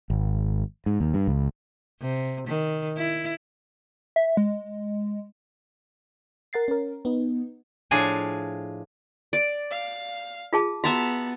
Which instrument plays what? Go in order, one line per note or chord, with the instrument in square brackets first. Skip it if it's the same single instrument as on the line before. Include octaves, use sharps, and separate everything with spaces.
[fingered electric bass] G#1
G#2
D#2
G2
C#2
[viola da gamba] C3
D#3
E4
[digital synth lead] E5
G#3
[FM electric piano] A#4 F#5 A6 C7
C#4 A#4
B3 D#4
[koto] A2 F3 D4 G#4 F5 G#5
[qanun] D5
[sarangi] F5
[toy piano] F4 G#4 A5
[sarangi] B3 [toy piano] F#4 [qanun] E5 A5 A#5